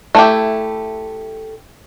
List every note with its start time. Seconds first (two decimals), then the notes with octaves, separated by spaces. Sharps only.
0.15 A3 E4 G4